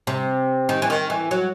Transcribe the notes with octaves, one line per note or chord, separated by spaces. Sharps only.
C3
D#3
E3
D#3
E3
F#3